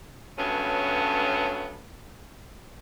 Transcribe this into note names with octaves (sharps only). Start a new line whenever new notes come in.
G2 F#3 A3 B3 C#4